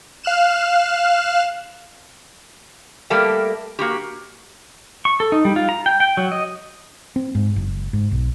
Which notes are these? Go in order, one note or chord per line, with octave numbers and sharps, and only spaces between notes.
F5 F6 F#6 E7
G3 A3 A#3 G4 A#4 E5
A#3 F#4 G4
C#6
A4
D#4
G3
F4
A#5
G5
G5
F#3
D#5
C4
G#2
F#1
G#2
B1